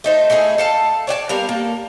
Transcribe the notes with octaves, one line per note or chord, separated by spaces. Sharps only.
A3 D#4 C5
A3 D#4 E4 G#4
A4 F5 A5
C#5 D5 F#5 A5
G3 B3 A#4 F5
A#3 A4